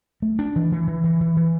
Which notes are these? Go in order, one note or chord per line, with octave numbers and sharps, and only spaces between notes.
A3
D4
E3
E3
E3
E3
E3
E3